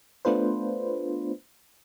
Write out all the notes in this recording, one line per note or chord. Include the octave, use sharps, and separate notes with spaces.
A3 B3 D4 F4 B4 C5